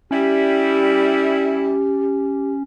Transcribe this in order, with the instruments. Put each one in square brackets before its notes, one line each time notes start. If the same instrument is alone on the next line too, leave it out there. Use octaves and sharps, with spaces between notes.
[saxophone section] G3 E4 [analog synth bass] C#4 [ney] G4